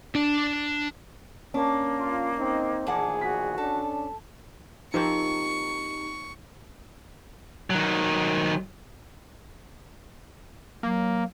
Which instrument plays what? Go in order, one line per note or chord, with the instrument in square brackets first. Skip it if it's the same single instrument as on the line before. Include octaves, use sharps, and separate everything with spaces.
[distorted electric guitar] D4 A5
[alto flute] A#3 [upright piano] C#4 [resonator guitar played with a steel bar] D4
[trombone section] F4
C4 D#4
[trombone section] A#1 D#3 G#4 [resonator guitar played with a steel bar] E2 D4 F#5
[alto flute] F#4 [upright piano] B6
[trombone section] C#4 D4 [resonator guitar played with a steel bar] A4
[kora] F3 A#3 C4 [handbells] D#4 G4 [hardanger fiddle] C#6
[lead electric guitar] D#3 F#3
[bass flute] F#3 [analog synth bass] A#3